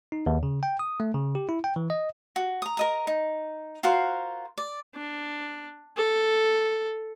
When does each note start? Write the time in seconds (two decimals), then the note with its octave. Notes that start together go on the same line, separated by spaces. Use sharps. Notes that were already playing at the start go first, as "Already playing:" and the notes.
0.12 D#4
0.26 D#2
0.43 C#3
0.63 G5
0.79 D#6
1.00 A3
1.15 C#3
1.35 G4
1.49 E4
1.64 G5
1.76 E3
1.90 D#5
2.36 F#4
2.62 A#5 D#6
2.77 A#4 D#5 A#5
3.07 D#4
3.83 F4 F#4 A#4 C5
4.58 D5
4.95 D4
5.97 A4